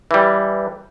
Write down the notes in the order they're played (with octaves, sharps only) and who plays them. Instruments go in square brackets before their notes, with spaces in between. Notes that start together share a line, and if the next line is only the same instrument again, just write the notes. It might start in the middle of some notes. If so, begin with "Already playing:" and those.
[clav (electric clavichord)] E3 G3